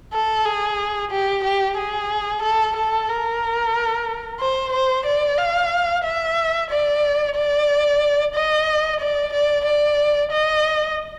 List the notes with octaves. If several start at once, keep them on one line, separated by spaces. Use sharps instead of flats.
A4
G#4
G4
G4
G#4
A4
A4
A#4
C5
C5
D5
F5
E5
D5
D5
D#5
D5
D5
D5
D#5